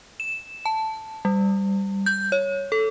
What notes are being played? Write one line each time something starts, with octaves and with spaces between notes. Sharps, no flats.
E7
A5
G3
G6
C#5
A4